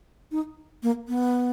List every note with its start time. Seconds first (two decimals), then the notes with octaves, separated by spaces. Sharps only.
0.31 D#4
0.83 A#3
1.08 B3